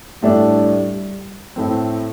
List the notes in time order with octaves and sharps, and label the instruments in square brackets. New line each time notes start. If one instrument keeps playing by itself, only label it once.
[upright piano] A2 A3 D4 [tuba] G3
[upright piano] A2 A3 C4